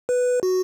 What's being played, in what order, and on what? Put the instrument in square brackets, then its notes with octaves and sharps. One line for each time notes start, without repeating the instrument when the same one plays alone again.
[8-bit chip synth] B4
F#4